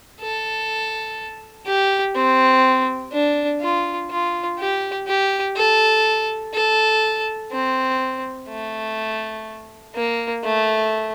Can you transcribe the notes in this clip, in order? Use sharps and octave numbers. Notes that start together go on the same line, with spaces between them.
A4
G4
C4
D4
F4
F4
G4
G4
A4
A4
C4
A3
A#3
A3